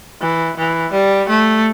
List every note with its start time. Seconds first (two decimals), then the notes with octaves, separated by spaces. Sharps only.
0.21 E3
0.57 E3
0.92 G3
1.29 A3